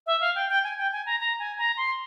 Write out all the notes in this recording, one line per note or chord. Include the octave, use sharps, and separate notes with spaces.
E5
F5
G5
G5
G#5
G5
G#5
A#5
A#5
G#5
A#5
C6